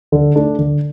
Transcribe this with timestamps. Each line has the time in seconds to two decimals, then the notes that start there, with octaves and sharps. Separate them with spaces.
0.12 D3
0.36 A3 D4
0.59 D3